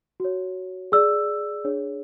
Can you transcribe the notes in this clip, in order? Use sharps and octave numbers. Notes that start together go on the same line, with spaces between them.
F#4 C#5
G#4 D5 E6
D4 G#4 C#5